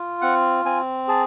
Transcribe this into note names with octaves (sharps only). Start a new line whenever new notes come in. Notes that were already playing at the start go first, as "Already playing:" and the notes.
Already playing: F4
C4 F#5
C4 G#5
G#4 A5